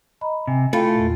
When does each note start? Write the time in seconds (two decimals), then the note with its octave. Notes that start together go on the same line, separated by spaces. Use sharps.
0.21 D#5 A#5 B5
0.47 C3 G#5
0.73 A3 E4 F4 A4 F5 G5 B5
0.95 E2 A#2